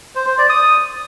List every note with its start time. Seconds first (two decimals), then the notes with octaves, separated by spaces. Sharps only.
0.15 C5
0.27 C5
0.38 D5
0.49 D#6